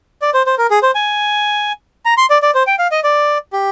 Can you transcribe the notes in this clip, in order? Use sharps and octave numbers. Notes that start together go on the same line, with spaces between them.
D5
C5
C5
A#4
G#4
C5
G#5
A#5
C6
D5
D5
C5
G5
F5
D#5
D5
G4